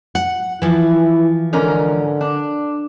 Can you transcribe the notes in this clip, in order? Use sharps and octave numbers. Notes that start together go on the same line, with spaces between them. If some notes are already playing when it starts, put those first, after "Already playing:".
F#5
E3 F3 E4
G#2 D3 C#4 A#4
D4